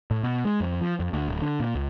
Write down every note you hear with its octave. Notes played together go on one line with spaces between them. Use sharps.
A2
B2
G#3
F2
F3
F2
D2
D1
D3
A#2
C#2